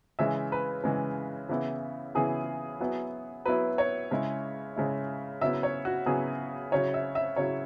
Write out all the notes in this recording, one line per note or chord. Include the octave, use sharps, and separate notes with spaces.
C#3 E3 G#3 E5
B4
C#3 E3 G#3
C#3 E3 B3 E4
C#3 E3 B3 E4 G#4
F#3 B3 E4
F#3 B3 E4 B4
C#5
C#3 G#3 E4
C#3 G#3 E4
C#3 F#3 B3 E4 E5
C#5
F#4
C#3 F#3 B3 E4 G#4
C#3 F#3 E4 C#5
E5
E5
C#3 F#3 E4 C#5